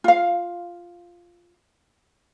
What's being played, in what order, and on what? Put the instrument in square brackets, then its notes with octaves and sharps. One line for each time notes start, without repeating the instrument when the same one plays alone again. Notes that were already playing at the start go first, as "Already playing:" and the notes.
[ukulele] F4 F5